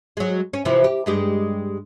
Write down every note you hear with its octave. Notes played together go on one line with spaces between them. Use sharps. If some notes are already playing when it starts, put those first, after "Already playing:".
F#3 G#3
C#4
C3 E3 F3
G4
G2 G#3 G4